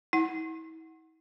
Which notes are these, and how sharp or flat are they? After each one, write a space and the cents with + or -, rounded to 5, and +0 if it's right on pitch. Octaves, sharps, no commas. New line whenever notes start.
E4 -40 F#5 +0